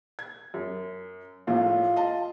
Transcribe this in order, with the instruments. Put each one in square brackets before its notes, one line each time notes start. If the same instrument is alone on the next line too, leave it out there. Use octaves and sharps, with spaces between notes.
[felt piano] G#6
F#2
[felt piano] A#1 A2 [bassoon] F4
[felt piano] D#5 A5